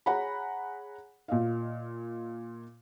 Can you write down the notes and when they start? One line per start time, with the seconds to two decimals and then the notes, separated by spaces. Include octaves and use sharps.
0.06 G#4 C#5 F#5 G#5 A#5 B5
1.28 A#2 D#5 F5